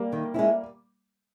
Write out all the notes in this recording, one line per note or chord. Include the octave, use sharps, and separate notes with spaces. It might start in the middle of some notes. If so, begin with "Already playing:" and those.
Already playing: G3 A#3
D#3
G#3 C#4 E4